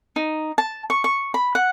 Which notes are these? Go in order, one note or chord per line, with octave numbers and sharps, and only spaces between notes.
D#4
A5
C#6
C#6
B5
F#5